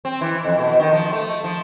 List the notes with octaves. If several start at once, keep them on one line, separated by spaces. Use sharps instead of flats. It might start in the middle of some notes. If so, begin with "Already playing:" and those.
C4
E3
F2
B2
D#3
F3
A3
F3